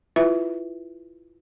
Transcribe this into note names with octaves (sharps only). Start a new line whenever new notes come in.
E4 F4 B4 E5